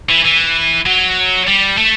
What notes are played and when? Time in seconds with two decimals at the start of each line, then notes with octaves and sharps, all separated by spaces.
0.09 E3
0.24 E3
0.86 F#3
1.47 G3
1.77 A3